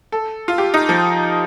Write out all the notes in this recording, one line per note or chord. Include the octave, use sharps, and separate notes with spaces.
A4
F4
G4
D#4
F3